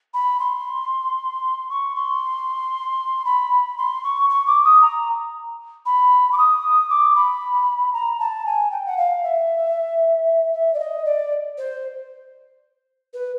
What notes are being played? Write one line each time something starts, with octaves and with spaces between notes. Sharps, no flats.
B5
C6
C#6
C6
B5
C6
C#6
C#6
D6
D#6
A#5
B5
D6
D#6
D6
B5
A#5
A5
G#5
G5
F#5
F5
E5
E5
D5
D#5
D5
C5
B4